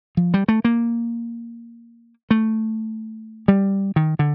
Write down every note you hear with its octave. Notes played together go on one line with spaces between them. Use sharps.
F3
G3
A3
A#3
A3
G3
D#3
D3